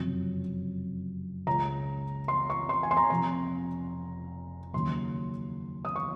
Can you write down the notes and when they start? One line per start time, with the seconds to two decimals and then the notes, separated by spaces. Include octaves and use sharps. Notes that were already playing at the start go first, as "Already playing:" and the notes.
Already playing: F#1 F2 C3 F#3
1.47 C#2 C#3 G#3 A#5
2.28 C6
2.50 C#6
2.69 C6
2.83 G#5
2.91 C6
2.97 A#5
3.10 F1 F2 C3 A#5
4.73 D#2 C#3 F#3 A#3 C6
5.85 D#6
5.96 C#6